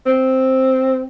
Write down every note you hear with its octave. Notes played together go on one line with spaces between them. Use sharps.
C4